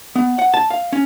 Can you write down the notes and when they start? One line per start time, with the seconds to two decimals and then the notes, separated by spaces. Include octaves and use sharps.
0.16 B3
0.39 F#5
0.54 A5
0.70 F5
0.93 C#4